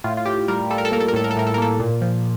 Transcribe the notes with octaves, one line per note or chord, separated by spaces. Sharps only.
A2 F4
F4
A2 G4
G3 A#4
G3 A4
A#4
A4
A#3 A#4
A4
A#4
A2 A4
A#4
A4
A2 A#4
A4
A#4
A#3 A4
A#2
F3